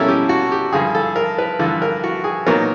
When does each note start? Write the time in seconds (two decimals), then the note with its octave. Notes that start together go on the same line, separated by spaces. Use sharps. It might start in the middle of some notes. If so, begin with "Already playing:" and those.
Already playing: B2 G3 A#3 C#4 E4 A4
0.08 G4
0.29 F#4
0.52 G4
0.73 G2 D3 F3 G#4
0.95 A4
1.16 A#4
1.39 B4
1.59 G2 D3 F3 A4
1.82 A#4
2.04 F#4
2.24 G#4
2.46 A#2 F#3 B3 D#4 A#4